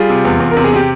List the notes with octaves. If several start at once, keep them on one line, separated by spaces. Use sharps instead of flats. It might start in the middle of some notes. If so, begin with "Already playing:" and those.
Already playing: G3 F4 G#4
C3
E2
E2
A#4
C3
G#4
C3 G4